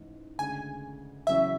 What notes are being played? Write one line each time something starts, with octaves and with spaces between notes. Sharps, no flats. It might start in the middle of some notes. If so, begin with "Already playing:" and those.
Already playing: A1 G#2 E3
D2 C#3 G#3 G#5
E2 C#3 F#3 C#4 E4 E5